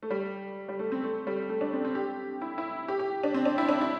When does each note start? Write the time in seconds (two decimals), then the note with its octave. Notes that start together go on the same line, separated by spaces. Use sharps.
0.03 A3
0.10 G3
0.69 G3
0.79 A3
0.92 C4
1.04 A3
1.27 G3
1.49 A3
1.61 D4
1.73 C4
1.85 C4
1.95 G4
2.42 E4
2.58 E4
2.88 G4
2.99 G4
3.23 D4
3.34 C4
3.45 D4
3.58 E4
3.69 D4
3.81 E4